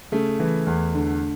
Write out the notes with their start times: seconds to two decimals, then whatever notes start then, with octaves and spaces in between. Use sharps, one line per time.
0.12 C#3 A3
0.40 E3
0.67 E2
0.94 D3